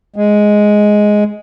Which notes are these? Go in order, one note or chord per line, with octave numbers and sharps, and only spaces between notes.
G#3